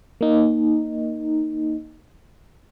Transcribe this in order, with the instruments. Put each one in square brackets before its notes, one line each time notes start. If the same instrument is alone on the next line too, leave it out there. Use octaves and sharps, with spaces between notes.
[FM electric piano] A#3 D#4